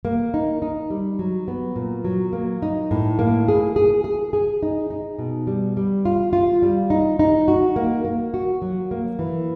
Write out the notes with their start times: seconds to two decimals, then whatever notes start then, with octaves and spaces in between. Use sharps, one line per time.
0.05 A#3
0.34 D#4
0.62 D#4
0.90 G3
1.19 F#3
1.48 B3
1.76 A#2
2.05 F#3
2.33 A#3
2.62 D#4
2.91 A2
3.19 A#3
3.48 G#4
3.76 G#4
4.04 G#4
4.33 G#4
4.63 D#4
4.90 D#4
5.19 B2
5.47 G3
5.77 G3
6.05 F4
6.33 F4
6.62 G3
6.90 D#4
7.19 D#4
7.48 F#4
7.76 A#3
8.05 A#3
8.34 F#4
8.62 F#3
8.91 A#3
9.19 E3